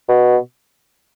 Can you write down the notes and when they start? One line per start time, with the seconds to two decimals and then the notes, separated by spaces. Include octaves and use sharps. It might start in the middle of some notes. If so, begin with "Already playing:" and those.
0.09 B2